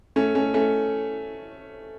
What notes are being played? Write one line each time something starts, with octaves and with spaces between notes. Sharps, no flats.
A3 C#4
A3 C#4
A3 C#4